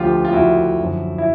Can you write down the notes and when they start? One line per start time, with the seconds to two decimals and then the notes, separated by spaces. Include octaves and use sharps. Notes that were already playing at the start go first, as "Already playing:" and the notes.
Already playing: D2 D3 F3 F4 G4
0.25 F4
0.33 D2 D3 F3 E4 F#4
0.79 F#2 D3 F3
1.18 E4